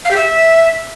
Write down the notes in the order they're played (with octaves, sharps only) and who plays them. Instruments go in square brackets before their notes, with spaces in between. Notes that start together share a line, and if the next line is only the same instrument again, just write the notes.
[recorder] F5
G4
E5